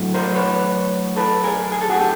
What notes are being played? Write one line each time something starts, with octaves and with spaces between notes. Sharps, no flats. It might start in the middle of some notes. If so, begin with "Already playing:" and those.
Already playing: A2 F#3 A3
A#4 C5
B4 C#5
A4 B4
G#4 A#4
G#4
A4
F#4 G#4
G4 A4